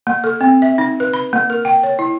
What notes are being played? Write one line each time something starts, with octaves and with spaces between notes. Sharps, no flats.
A#3
A4
C4
E5
D#4
B4
B5
A#3
A#4
G5
C#5
E4